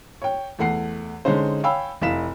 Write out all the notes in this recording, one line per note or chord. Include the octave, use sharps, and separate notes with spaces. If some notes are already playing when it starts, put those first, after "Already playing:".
C#5 G5
E2 A3 F#5 C7
D3 G#3 C#4 D#4 C5
C#5 F5 G5 G#5 B5 E6
F1 E4 F5 B6 E7